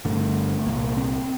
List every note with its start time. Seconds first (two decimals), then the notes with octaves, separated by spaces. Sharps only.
0.05 G1 G2 D3 A3
0.66 C2 A#2 A#3
0.97 C4